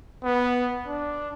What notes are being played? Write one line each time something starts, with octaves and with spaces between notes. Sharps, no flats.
B3
D4